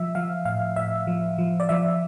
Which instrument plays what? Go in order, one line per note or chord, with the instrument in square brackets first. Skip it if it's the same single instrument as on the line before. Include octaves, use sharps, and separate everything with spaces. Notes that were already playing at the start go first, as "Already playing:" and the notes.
Already playing: [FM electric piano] F3 E5
F3 F5
A2 F5
A2 E5
F3
F3
D5
F3 E5